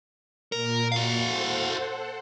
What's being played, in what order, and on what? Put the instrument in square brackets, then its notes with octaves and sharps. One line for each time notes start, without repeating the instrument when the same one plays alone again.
[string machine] A#2 [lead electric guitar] A#4
[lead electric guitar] F#4 F5
[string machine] A4 C5 F#5